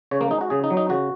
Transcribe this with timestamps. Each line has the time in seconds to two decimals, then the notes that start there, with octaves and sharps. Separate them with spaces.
0.11 C#3 C#5
0.21 A#3
0.31 G#3 D#4
0.41 F#4
0.50 C#3 G#4
0.64 D#4
0.70 F#3
0.77 D#4
0.89 C#3 F#4